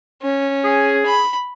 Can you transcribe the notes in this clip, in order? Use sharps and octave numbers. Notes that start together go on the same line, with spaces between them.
C#4
G#4
B5